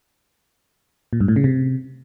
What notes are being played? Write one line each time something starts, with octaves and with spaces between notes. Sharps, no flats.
A#2
G2
A2
C#3
C3